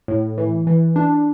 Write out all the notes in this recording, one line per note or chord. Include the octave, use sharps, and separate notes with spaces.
A2
E3
E3
D4